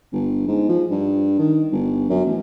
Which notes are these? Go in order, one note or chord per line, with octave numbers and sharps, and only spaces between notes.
G1
G#2
F3
G2
D#3
G1
F#2
A1